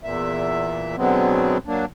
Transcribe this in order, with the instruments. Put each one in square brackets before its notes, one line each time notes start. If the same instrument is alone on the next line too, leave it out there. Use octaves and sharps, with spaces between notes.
[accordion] E2 A#2 E5
B2 D3 F#3 G#3 B3 C4
F#3 A#3 D4